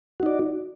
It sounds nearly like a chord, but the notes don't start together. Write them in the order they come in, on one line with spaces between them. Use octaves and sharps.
F#4 D#4 D5